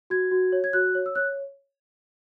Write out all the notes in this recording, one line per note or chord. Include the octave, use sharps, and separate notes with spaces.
F#4 G#6
F#4
C#5
G#6
F#4 F#6
C#5
E6
C#5 F#6